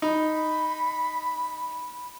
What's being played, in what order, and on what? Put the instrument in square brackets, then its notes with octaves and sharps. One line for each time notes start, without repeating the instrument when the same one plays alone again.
[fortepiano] D#4 [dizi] B5